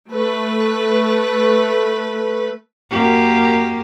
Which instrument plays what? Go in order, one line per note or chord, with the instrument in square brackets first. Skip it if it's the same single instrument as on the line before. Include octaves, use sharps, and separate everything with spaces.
[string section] A3 B4
[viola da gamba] F#2 A#3 G4